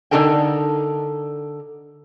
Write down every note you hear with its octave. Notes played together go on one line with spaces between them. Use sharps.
D3 D#4 F#4 A4 A#4 G5